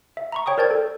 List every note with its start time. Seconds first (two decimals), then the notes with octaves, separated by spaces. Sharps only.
0.17 E5
0.32 A#5 B5 C#6
0.46 C#5 G5 C#6 D#6
0.58 A#4 C5 D5 A5 G6 G#6
0.71 A4